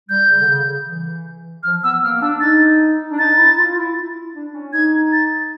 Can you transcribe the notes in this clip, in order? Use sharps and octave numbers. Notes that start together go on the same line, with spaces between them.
G3 G6
C#3
D3
C#3
E3
F3 F6
B3 E6
A#3 F6
D4 E6
D#4 A6
D4
D#4 A6
E4
F4
E4
E4
D4
C#4
D#4 G#6
A6